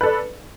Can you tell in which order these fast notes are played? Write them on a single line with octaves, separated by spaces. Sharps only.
B4 A4 D5